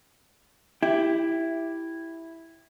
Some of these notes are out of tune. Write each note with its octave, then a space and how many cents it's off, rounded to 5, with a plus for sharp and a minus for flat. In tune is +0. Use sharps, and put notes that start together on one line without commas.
E4 +0 G4 +0